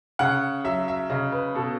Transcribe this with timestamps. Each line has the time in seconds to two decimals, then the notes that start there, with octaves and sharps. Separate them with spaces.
0.19 C#3 F#5
0.64 F#3 E5
0.88 E5
1.10 C#3 D#5
1.32 B4
1.55 B2 A4